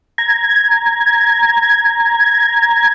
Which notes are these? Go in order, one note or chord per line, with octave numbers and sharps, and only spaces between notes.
A#5 G#6